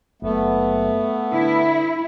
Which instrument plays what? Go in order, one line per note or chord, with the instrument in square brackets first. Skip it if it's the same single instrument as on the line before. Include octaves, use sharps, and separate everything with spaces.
[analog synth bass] F#1 [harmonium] A3 B3
[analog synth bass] D3 [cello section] E4